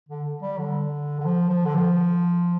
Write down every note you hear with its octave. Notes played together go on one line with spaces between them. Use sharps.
D3
G3
D3
D3
F3
F3
D3
F3